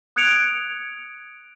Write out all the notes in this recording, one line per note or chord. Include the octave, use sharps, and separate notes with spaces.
D#6 F#6 G#6 C#7 D7 F7